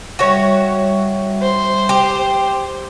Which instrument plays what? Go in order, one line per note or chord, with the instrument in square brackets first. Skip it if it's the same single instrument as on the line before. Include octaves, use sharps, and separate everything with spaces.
[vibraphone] G3 E5 [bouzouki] F#4 C#5
[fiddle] C5
[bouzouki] G4